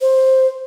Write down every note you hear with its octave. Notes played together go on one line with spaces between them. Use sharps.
C5